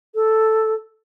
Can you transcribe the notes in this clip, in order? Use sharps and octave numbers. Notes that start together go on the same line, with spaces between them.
A4